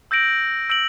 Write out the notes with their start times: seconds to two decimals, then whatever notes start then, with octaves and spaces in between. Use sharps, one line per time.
0.11 E6 G6 A#6 D7 F#7
0.69 E6 G6 A#6 D7 F#7